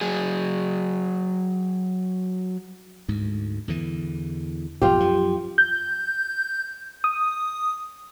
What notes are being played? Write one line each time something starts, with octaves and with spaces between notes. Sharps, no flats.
F#3 G#4
D2 G#2
E2 D3 E3
B1 F2 F4 G4
F#2 F3
G6
D#6